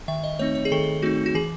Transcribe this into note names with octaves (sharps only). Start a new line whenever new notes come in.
D#3 E5
D#5
A3 C4 D#4 C#5
C#5
G#4
D#3 A4
A3 C4 D#4 F#4
F#4
E3 G#4